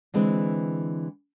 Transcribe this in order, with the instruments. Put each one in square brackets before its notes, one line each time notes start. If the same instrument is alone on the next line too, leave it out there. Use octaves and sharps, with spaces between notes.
[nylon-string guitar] D3 E3 G#3 C4